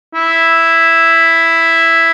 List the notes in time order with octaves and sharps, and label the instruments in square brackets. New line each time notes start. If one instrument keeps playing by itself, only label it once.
[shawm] E4